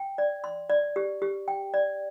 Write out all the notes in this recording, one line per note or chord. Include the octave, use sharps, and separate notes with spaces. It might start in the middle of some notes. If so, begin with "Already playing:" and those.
Already playing: G5
D5
C6
D5
G4
G4
G5
D5